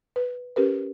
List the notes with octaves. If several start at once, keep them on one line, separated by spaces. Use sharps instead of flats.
B4
C#4 G4 A#4 B4